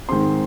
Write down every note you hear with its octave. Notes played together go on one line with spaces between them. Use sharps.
G#2 D#3 G#3 C4 C6